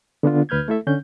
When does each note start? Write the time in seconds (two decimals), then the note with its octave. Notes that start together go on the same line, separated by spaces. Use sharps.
0.23 D3 B3 D4 F4
0.49 D2 B4 F6 G6 G#6
0.68 A3 E4 A4 E5
0.87 D3 C#4 G6